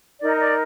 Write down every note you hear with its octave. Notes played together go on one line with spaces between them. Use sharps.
D#4 A#4 D5
D#5
D5